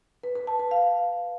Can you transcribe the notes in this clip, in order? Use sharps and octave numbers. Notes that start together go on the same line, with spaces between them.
B4
B4
A5
B4
F5